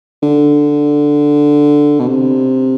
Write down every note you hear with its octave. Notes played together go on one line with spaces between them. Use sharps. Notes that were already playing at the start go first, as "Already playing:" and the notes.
D3
B2
C3